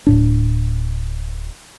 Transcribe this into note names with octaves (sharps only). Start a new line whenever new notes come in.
D1 A2 D4